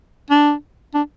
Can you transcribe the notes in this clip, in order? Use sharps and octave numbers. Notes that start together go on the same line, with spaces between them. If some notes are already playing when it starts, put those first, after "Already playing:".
D4
D4